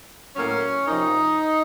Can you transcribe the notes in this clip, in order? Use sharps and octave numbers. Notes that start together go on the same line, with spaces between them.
A2 F#3 A#3 C#4
C3 F3 A#3 D#4